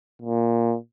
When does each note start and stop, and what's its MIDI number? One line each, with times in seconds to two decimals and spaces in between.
0.22 0.75 46